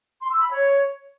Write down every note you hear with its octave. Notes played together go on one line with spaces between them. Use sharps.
C6
E6
B5
C#5